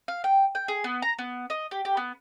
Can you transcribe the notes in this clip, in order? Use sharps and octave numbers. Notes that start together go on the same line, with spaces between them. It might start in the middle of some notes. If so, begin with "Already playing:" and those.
F5
G5
G5
G#4
B3
A#5
B3
D#5
G4
G4
B3